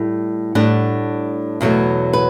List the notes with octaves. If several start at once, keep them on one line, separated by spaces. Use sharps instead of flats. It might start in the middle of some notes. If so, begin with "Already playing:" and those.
Already playing: A2 G3
A2 G3 D4 F#5
E2 B2 F#3 A3
B4